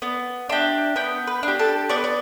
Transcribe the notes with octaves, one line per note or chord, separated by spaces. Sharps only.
B3 D5
D4 G4 E5
B3 G5
B4
D4 G4
A4
B3 D5
B4
D5